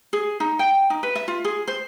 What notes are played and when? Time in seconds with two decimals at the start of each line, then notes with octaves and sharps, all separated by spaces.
0.13 G#4
0.40 D#4
0.59 G5
0.90 D#4
1.03 B4
1.15 E5
1.28 F4
1.44 G#4
1.68 C5